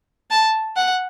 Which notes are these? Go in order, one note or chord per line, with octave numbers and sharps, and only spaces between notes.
A5
F#5